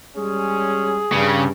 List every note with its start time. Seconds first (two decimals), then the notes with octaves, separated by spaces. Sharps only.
0.16 G3 G#3 C#4 G#4
1.13 G2 C#3